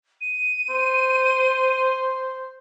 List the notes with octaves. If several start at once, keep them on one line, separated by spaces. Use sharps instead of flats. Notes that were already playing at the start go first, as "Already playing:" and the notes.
D#7
C5